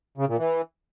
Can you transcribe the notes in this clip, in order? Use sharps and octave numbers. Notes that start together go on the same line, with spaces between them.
C#3
A#2
E3